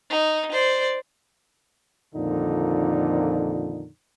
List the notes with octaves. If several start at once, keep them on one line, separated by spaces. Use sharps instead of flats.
D#4
C5 D5
F2 A#2 D3 D#3 D#4